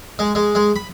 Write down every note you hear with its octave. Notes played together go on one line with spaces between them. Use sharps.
G#3
G#3
G#3
B5